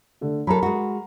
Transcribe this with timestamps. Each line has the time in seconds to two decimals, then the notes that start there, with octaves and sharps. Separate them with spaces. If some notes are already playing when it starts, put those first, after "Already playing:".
0.21 D3 A3
0.47 F#3 A4 A#4 A#5 B5
0.63 G#3 F#4